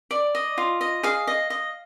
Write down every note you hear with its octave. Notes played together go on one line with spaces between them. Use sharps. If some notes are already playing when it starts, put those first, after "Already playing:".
D5
D#5
F4
D#5
G#4 F5
D#5
D#5